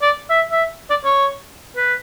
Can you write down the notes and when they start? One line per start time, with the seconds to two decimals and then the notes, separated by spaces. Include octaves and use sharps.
0.02 D5
0.30 E5
0.52 E5
0.90 D5
1.04 C#5
1.77 B4